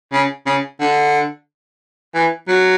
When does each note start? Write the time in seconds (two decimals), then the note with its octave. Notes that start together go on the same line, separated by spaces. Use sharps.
0.13 C#3
0.46 C#3
0.80 D3
2.15 E3
2.48 F#3